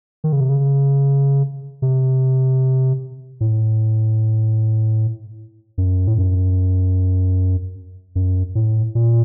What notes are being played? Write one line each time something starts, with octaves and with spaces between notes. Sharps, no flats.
D#3
C#3
C3
C#3
C3
A2
F#2
A2
F#2
F#2
A2
A#2